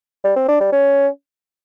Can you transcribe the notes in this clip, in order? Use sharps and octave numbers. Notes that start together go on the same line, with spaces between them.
G3
C4
D4
G3
C#4